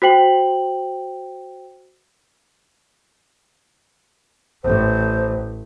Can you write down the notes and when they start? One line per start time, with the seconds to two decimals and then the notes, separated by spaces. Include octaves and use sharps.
0.02 F#4 C5 G5 F#7
4.64 A1 C5